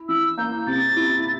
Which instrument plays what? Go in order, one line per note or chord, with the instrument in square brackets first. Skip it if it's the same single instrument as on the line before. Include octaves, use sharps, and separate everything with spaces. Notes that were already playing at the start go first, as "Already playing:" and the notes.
Already playing: [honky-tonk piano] E4
[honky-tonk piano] E3 [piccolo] E6
[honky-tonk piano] A#3 [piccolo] G6
[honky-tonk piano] C3 [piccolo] A6
[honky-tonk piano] E4